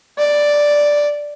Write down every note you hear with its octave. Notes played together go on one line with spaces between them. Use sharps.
D5